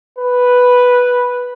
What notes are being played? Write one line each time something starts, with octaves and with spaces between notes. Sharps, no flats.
B4